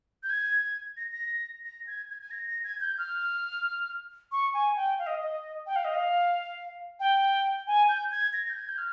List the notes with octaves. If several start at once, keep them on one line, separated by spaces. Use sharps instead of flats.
G6
G#6
A#6
A#6
A#6
G#6
G#6
G#6
A#6
A#6
G#6
G6
F6
C#6
G#5
G5
F5
D#5
D#5
G5
F5
D#5
F5
G5
G#5
G6
G#6
A#6
G6
G#6
G6
F6